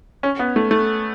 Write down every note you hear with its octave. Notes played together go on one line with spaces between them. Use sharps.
C#4
B3
A3
A3